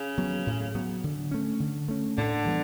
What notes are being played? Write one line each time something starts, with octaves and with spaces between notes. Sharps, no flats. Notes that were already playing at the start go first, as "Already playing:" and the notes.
Already playing: C#3
F#3 B3
A2
F#3 B3
D3
A3 C#4
D3
A3 C#4
A2 D3
E3 G3 B3